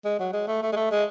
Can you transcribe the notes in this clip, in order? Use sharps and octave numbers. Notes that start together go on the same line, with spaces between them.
G#3
F#3
G#3
A3
A3
G#3
A3
G#3